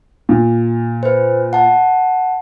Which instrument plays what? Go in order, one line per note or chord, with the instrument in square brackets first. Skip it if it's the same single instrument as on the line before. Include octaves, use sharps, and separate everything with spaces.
[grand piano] A#2
[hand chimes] B4 C5
F#5 A5